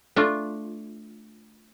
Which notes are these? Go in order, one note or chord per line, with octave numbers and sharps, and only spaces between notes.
A3 D4 F4